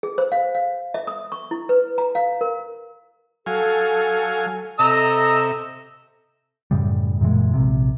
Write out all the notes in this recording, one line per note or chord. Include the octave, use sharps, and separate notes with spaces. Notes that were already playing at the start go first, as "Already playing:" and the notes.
G#4
C5
F5
F5
E5
D#6
C#6
E4
B4
A#5
F5
A#4
F#3 A4 F5 G#5
C3 A4 D#5 E5 A#5 E6
F#2 A2 C#3 G3
F#2 A#2 E3 G#3
A#1 C3